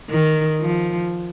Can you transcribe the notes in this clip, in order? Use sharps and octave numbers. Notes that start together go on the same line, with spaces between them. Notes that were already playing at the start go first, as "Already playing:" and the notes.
D#3
F3